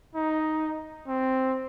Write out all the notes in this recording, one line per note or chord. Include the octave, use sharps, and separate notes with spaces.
D#4
C4